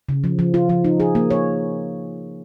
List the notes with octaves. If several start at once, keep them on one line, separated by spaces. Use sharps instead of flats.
C#3
F3
F3
F4
F3
D#4
G#4
A#3
C#5